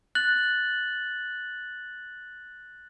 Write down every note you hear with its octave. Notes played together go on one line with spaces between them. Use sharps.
F#6 A6 F#7